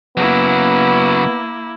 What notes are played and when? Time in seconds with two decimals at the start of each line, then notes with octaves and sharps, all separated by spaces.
0.17 C#3 F#3 A#3 B3 E4